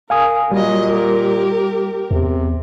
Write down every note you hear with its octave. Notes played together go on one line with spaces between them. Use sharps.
A#4 F5 G#5 D#6
A#2 F#3 G3 D#5
G4 A#4
E2 C3